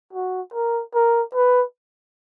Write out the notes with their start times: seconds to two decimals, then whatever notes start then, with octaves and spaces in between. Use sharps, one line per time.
0.13 F#4
0.54 A#4
0.94 A#4
1.35 B4